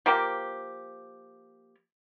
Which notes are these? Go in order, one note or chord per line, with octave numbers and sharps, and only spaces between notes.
F3 A#3 G4